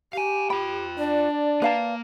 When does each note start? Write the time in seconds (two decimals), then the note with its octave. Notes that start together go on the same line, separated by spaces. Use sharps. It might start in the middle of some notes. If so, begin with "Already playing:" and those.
0.13 G4 F5 G#5
0.50 F4 G5 B5
0.99 D4 D5
1.62 A#3 B4 F5 A5 A#5